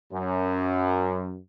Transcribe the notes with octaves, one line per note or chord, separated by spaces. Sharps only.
F#2